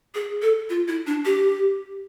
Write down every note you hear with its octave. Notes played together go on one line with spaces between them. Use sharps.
G#4
A4
F4
E4
D4
G4